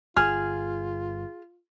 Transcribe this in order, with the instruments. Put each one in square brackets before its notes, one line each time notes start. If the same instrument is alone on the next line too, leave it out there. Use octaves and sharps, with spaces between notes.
[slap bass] G1 [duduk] F4 [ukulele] G#4 [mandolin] F6